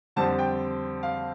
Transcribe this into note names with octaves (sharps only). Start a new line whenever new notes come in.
F2 D3 G3 C4 A5
G5
F5